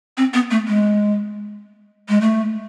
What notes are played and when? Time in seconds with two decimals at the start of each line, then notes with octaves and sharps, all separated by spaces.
0.17 C4
0.33 B3
0.51 A3
0.67 G#3
2.09 G#3
2.21 A3